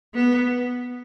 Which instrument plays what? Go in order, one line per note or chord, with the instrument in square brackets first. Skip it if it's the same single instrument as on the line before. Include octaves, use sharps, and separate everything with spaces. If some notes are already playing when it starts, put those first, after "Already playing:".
[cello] B3